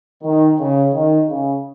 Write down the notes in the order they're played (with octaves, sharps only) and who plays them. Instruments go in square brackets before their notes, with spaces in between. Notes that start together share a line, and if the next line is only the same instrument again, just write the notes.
[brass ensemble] D#3
C#3
D#3
C#3